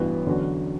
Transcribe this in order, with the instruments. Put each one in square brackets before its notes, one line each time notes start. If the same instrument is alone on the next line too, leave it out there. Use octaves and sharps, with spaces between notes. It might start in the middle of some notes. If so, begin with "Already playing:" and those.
Already playing: [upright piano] A1 G2 E3 B3 F#4
E2 D3 F#3 C#4 F#4